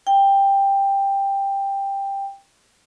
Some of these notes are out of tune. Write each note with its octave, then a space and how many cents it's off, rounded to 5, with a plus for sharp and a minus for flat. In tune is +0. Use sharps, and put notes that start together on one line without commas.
G5 +10